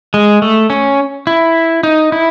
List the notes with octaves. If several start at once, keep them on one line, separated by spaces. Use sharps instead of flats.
G#3
A3
C#4
E4
D#4
E4